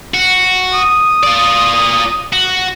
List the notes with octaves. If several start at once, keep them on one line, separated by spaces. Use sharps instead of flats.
F#4
D#6
F4 D5
F#4